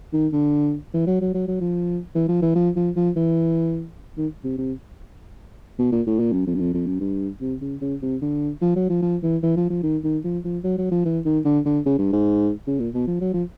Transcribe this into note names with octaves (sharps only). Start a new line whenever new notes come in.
D#3
D3
E3
F#3
F#3
F#3
F#3
F3
E3
F3
E3
F3
F3
F3
E3
D#3
C3
C3
B2
A#2
A2
A#2
F#2
F2
F#2
F2
F2
F#2
G2
C3
C#3
C#3
C3
D3
F3
F#3
F3
F3
E3
E3
F3
F3
D#3
D#3
F3
F3
F#3
F#3
F3
E3
D#3
D3
D3
C#3
G2
G#2
C#3
A#2
B2
F3
F#3
F3